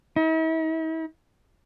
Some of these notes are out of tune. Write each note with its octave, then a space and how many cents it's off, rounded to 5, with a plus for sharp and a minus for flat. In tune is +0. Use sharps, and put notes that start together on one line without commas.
E4 -45